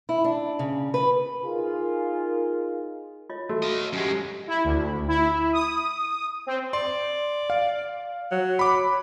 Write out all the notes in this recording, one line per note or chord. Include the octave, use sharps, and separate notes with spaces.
E4
D4
C#3
B4
D#4 F4 G#4 A#4
F4 C#5 D#5
A3 F#4
D#5 F5
F#2 G#3 G4 E6
E4
D2
E4
D#6
C4
D5 C6
F5
F#3
B5 D6